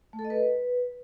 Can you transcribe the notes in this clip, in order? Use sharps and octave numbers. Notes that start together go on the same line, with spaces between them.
A3
A4
D#5
B4